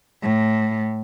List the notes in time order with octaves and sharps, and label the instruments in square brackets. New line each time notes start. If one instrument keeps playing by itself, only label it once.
[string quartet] A2